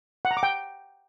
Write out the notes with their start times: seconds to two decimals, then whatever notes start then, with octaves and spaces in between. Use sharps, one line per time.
0.25 F#5
0.31 A#5
0.37 D6
0.43 G5